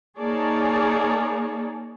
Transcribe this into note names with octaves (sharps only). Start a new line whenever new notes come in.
A#3 D#4 G#4 C#5 D5 A5